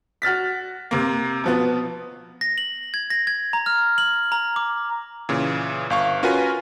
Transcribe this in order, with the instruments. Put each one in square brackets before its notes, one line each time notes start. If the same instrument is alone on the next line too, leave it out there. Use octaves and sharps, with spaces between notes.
[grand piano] F#4 F6 A6 B6
C3 A#3
B2 F3 B3
[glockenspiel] A#6
F#7
G#6
A#6
G#6
A#5
F6
F#7
A#5
D6
[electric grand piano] A#2 C#3 E3
G1 F5 C#6
C#4 F4 F#4 A#4 B4 G#5